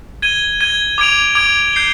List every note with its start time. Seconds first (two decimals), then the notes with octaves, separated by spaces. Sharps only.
0.22 G#6 D#7 G7
0.60 G#6 D#7 G7
0.98 D6 G#6 D7 F7
1.35 D6 G#6 D7 F7
1.73 G6 C7 G7